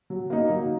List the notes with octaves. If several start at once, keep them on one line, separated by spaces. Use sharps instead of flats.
F#3
A#3 D#4
F#3